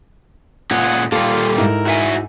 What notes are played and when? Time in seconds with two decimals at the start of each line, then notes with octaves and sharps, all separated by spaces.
0.71 A#2 G#3 C#4 F4 F#5
1.12 A#2 G3 A#3 F4 A4
1.57 G#2 D#4 E4 A#4
1.86 F#4 E5 G#5